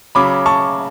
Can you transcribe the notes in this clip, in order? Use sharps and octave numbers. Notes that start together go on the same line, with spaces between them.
C#3 F#3 B5 D6
A5 C#6